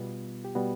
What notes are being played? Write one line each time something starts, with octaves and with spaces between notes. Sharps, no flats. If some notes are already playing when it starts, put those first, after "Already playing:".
Already playing: B2 G3 B3 F4
G4
B2 G3 B3 F#4